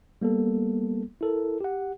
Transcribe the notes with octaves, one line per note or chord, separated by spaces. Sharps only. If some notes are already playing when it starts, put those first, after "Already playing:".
G3 A#3 B3 A4
E4 A4 A#4
G4 F#5